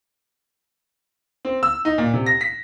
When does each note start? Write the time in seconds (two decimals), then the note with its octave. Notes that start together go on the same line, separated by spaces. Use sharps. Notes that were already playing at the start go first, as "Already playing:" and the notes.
1.45 C4
1.63 E6
1.85 D#4
1.98 A#2
2.13 C3
2.26 A#6
2.41 B6